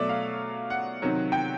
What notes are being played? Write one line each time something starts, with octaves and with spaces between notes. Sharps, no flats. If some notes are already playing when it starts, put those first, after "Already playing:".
Already playing: B2 F#3 A3 D5 E5
F5
F#5
C3 D#3 F#3
G5